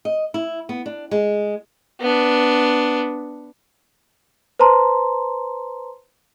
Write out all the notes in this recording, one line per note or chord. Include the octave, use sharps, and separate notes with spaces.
D#5
E4
B3
D4
G#3
B3 D4
B4 C5 A5 A#5 C6